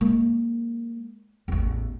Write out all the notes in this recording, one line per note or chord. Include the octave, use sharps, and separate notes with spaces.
G#3 A#3
A1 E2